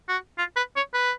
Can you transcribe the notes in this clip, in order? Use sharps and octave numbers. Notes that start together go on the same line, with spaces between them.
F#4
F4
B4
C#5
B4